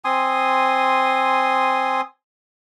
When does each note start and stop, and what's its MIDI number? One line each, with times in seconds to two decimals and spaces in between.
0.05 2.01 60
0.05 2.01 80
0.05 2.01 84
0.05 2.01 87